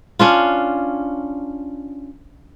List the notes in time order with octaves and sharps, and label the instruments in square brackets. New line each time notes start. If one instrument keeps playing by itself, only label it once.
[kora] C#4 D4 F4